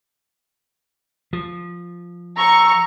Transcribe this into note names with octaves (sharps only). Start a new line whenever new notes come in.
F3
A#5 C#6 E6